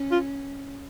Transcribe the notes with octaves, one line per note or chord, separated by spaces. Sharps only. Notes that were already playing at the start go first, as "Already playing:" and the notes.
Already playing: C#4
F4